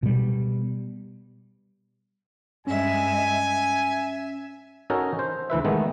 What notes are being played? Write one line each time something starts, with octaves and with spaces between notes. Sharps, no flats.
B2 G3
G2 G#3 C#4 E5 G#5
E5
C#4 D#4 F#4 A4 A#4 C#5
C5
D2 E3 B4 E5
D#3 G#3 A3 B3